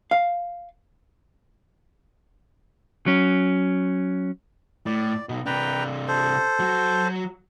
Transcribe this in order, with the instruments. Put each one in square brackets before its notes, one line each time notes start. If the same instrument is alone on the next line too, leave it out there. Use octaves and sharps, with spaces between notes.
[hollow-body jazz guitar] F5
[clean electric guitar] F#3 C#4
[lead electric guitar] A2 [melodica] D5
[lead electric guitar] B1 B2
[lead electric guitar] C3 D4 [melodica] B4 G5 A#5
[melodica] A4 C5
[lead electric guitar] F#3 F#4